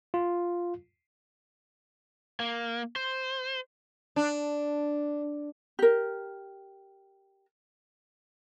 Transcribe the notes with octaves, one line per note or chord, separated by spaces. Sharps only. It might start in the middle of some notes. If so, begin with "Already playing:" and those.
F4
A#3
C5
D4
G4 A#4